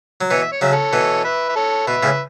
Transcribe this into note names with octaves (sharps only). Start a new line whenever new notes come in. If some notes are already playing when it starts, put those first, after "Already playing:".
F#3
B2 E3 C#5
E5
C#5
C#3 F#3 E5
A4 C#5
B2 E3
B4 E5
E5
A4 C#5
B2 B4 E5
A2 C#3